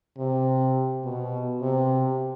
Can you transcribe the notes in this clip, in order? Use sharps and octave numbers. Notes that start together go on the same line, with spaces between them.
C3
B2
C3